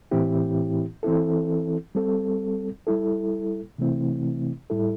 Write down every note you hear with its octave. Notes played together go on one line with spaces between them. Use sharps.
A2 E3 C4 E4 G4
E3 C4 E4 A4
G3 C4 A4
G3 E4 A4
C3 E3 A3 C4 E4
A2 G3 E4 A4